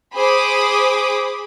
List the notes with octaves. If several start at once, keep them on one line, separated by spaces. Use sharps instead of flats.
G#4 C5 B5 D6 D#6